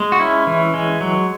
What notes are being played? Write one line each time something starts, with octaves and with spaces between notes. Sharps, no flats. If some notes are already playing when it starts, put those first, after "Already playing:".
Already playing: G#3
F#4
C#4 E4
E3
G#3
F#3